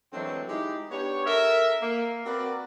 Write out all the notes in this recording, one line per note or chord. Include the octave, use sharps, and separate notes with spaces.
D3 E3 F#3 G#3 A3 C4
G#3 D#4 E4 G4
B3 D4 G4 C#5
A4 A#4 E5
A#3
C4 F#4 A#4 B4 D5